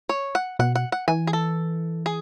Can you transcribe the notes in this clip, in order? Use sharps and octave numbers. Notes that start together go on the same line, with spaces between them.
C#5
F#5
B2 F#5
F#5
F#5
E3 G#5
G#4
A4
G#4